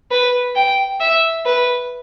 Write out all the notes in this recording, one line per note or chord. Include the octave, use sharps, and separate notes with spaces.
B4
G5
E5
B4